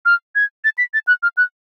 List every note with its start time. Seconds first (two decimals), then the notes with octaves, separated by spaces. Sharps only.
0.05 F6
0.35 G#6
0.65 A6
0.78 B6
0.94 A6
1.07 F#6
1.23 F6
1.37 F#6